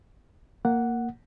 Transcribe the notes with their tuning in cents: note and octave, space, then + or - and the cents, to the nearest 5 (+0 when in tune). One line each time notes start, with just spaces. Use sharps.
A#3 -5 F#5 +0